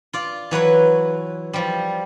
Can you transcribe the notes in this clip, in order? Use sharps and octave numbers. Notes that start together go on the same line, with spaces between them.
F4 D5
E3 F#3 B4 C#5
F3 G3